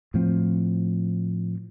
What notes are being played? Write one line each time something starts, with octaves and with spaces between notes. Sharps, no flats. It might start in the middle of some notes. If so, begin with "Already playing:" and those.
A2 F3 C4